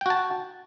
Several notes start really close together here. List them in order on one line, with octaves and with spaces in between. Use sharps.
G5 F#4 A5